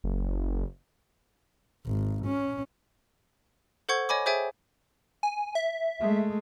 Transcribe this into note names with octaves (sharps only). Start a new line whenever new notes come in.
F#1
G#1
C#4
A4 C5 F#5 C#6 G#6
C#5 D#5 G#5 B5 D6
G#4 C5 C#5 E5 G5 G#5
G#5
E5
G#3 A3